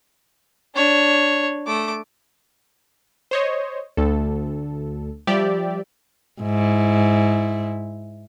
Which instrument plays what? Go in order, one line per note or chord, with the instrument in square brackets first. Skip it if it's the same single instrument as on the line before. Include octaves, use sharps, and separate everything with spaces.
[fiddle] D4 C#5
A3 D6
[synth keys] C5 C#5 D#5
D2 A4
F3 G3 G4 D5 E5
[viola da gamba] G#2 E4